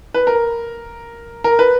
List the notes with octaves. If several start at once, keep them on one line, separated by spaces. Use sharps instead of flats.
B4
A#4
A#4
B4